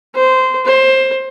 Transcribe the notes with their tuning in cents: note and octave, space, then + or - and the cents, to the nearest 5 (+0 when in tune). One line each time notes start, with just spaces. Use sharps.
C5 -15
C5 +15